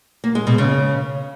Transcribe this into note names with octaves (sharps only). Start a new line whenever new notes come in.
A#3
G#3
B2
C#3